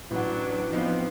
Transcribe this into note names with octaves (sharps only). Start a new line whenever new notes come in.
A1 F#3 D4 F#5
F3 B3 C4 D#4 E4